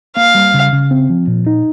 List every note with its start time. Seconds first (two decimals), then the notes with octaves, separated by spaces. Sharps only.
0.16 A#3 F5
0.35 G3
0.54 C#3
0.73 C#3
0.91 C4
1.10 F3
1.28 A#2
1.47 D#4